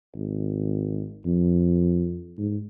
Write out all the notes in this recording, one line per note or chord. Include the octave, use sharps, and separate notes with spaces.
G#1
F2
G#2